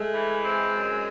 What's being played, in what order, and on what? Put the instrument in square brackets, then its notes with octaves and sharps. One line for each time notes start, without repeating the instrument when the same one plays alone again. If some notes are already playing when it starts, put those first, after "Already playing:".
Already playing: [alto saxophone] G#3 [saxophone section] A3
[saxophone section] E3
C4
F#2